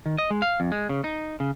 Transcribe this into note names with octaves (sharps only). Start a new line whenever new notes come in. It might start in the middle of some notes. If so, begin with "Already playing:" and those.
D#3
D#5
G#3
F5
F2
G#3
C#3
D#4
C#3